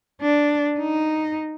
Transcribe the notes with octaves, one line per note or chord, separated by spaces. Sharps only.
D4
D#4